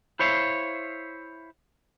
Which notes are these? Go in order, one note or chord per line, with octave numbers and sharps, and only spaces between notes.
E4 C5 C#5 E5 F5